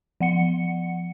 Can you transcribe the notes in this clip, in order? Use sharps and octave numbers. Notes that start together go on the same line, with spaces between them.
F3 F#5 C#7